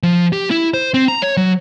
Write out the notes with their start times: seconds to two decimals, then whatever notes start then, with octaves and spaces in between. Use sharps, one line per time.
0.03 F3
0.33 G4
0.51 E4
0.74 C5
0.94 C4
1.08 A#5
1.22 C#5
1.37 F#3